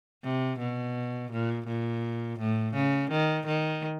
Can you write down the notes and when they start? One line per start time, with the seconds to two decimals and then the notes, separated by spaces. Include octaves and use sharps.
0.24 C3
0.59 B2
1.32 A#2
1.67 A#2
2.39 A2
2.74 C#3
3.11 D#3
3.47 D#3